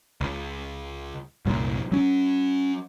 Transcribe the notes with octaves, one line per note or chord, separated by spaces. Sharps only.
C#2
C2 F#2 A#2
F#3 C#4